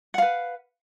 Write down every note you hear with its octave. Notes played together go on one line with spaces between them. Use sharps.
B4 F5 F#5